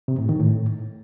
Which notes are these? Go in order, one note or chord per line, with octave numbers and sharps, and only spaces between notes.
C3
A2
D#3
A2